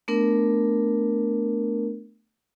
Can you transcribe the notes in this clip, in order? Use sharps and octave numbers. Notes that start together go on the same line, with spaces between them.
A3 B3 D4 A#4